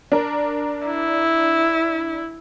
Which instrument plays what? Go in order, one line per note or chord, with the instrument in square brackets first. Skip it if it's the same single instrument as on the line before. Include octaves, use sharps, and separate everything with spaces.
[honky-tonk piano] D4 A#4
[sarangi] E4